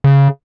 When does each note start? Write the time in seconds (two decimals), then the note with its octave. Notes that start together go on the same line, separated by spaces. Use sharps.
0.04 C#3